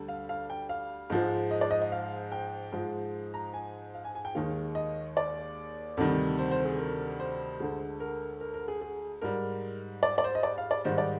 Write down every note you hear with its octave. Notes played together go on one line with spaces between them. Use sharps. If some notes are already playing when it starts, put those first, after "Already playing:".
Already playing: D2 D3 G3
F5
F5
G5
F5
G#2 F3 G#3
D#5
D5
D#5
D#5
F5
G5
G#2 F3 G#3
A#5
G#5
F5
G#5
G#5
G5
D#2 D#3 G#3 F5
D#5
D5
D2 C3 D#3 G3
C5
C5
G#4
A#4
C5
D2 D3 G#3
A#4
A#4
A#4
G#4
G#4
G#2 G3 A#4
D5
D5
C5
D#5
D5
F5
D5
G#2 D#3 G3 C5
D5